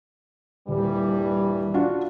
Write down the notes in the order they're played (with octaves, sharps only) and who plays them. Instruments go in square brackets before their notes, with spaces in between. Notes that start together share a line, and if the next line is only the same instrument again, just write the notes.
[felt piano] D#1 [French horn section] G2 E3 G3
[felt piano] D4 F4 F#4